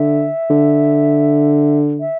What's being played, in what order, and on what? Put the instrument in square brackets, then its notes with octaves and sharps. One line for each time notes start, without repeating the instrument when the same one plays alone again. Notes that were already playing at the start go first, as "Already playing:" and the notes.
Already playing: [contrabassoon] D3 [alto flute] E5
[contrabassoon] D3
[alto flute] E5